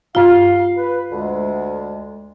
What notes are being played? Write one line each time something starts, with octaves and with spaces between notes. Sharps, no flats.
G2 F4 F5
B4
D2 G#3